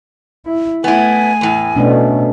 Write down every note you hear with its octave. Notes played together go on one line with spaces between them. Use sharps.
E4
A3 B3 E4 G#5
E2 A2
B2 A3 C#4 D4